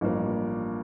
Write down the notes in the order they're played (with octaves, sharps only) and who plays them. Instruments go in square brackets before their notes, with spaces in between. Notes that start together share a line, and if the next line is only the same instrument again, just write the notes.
[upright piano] A1 G2 F3 A#3